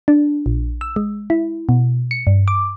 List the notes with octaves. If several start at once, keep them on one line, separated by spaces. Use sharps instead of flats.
D4
A#1
E6
G#3
E4
B2
C#7
G2
D6